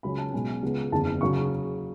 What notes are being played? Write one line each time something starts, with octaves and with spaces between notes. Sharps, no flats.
C#2 C#3 F#3 C#4 B5
A5
B1 B2 G#3 G#5
C#2 C#3 G#3 B3
F#1 E2 D3 A5
C#3 F#3 C#6